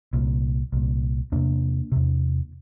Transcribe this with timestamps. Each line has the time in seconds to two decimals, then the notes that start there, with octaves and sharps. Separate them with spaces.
0.13 C2 A#2
0.72 C2 A#2
1.32 E2 C3 A#3 D4
1.92 E2 C3